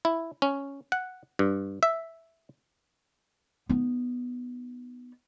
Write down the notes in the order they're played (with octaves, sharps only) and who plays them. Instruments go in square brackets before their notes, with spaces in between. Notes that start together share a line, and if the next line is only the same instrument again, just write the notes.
[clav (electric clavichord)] E4
C#4
F#5
G2
E5
[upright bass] B3 D#4